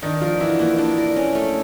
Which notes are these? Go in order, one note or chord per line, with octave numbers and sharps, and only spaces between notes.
D#3 D4 D#4
F3 F4 A#4
E3 E4 F#4
E3 A#3 E4
D4
A#4
C#4
A3